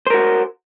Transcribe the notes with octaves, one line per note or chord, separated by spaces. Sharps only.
F#4 A#4 C5